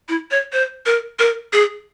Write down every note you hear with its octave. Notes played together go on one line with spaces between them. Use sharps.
E4
C#5
C5
A#4
A#4
G#4